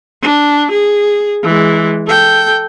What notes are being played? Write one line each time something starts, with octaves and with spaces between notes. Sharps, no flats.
D4
G#4
E3 G#3
A4 G5